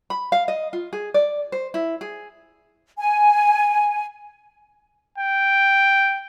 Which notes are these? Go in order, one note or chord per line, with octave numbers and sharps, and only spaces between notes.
B5
F5
D#5
F4
G#4
D5
C5
E4
G#4
G#5
G5